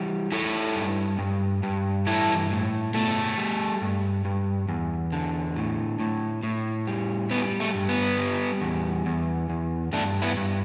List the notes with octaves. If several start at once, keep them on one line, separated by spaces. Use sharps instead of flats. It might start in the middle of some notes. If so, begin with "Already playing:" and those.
Already playing: E3 G3
G3 E4 A4
G2
G2
G2
E3 E4 A4
A2
B2 A3
G3
G2
G2
E2
D3
A2
A2
A2
G3
G3 B3
A3
G2
B3
G3
E2
E2
E2
G2 A3 D4
B3 E4
G2